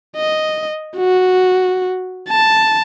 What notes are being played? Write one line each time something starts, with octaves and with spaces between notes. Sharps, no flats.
D#5
F#4
A5